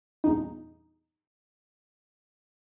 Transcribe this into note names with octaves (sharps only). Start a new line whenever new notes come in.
E2 G2 A#2 C#3 E3 D#4